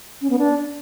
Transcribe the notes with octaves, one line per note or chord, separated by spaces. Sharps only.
C#4
B3
D4